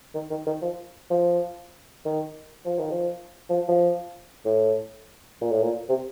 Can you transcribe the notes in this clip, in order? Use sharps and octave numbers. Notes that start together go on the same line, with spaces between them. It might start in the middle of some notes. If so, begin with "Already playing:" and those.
D#3
D#3
D#3
F3
F3
D#3
F3
D#3
F3
F3
F3
A2
A#2
A2
A#2
C3